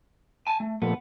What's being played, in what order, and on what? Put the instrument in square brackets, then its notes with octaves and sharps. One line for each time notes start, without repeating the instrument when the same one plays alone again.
[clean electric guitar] G#5 A5
A3
[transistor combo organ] A#2 F3 A3 [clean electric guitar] B3